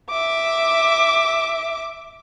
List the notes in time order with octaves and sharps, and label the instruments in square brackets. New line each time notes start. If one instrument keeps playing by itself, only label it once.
[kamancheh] E5 D6